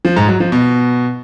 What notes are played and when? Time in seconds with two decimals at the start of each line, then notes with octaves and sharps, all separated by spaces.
0.05 F3
0.16 G#2
0.28 F#3
0.40 F3
0.52 B2